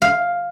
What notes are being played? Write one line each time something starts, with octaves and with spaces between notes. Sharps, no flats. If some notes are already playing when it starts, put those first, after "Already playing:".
F5